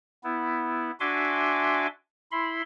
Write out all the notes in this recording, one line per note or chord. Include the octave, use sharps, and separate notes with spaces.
B3 E4
D4 F#4 E5 G#5 C6 D6
E4 B5 C6